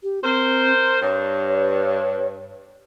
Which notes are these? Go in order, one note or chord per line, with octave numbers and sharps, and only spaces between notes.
G4
C4 A#4 C5
G2 C#5